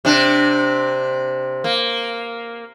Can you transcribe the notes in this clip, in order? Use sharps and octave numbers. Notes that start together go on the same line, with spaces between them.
C3 D4
A#3